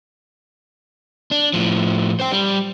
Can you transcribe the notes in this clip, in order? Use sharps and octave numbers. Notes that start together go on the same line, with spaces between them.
D4
A2 F3
C5 G5
G3